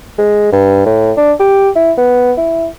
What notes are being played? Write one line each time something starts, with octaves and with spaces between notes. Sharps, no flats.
G#3
G2
A2
D4
G4
E4
B3
E4